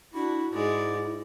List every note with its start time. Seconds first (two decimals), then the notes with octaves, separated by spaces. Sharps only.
0.14 D4 E4 F#4
0.53 G#2 G#3 E4 D5